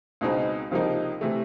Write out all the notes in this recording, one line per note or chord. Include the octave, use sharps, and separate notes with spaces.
C#2 B2 G#3 C4 D#4
C#2 C3 F3 A#3 D#4
C3 E3 A3